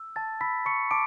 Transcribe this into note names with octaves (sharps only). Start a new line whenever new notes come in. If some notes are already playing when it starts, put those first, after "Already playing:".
Already playing: E6
A5 A6
B5 E6 B6
A5 C#6 C#7
A5 D6 D7